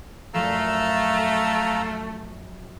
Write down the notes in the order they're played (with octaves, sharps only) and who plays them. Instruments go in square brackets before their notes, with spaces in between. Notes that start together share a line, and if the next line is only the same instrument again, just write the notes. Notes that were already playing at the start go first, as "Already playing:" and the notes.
[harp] F#2 A#2 F3 [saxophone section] A3 [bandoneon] F5 A#5 E6